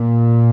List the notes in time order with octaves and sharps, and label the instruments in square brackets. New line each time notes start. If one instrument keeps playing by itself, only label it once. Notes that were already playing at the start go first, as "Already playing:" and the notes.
Already playing: [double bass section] A#2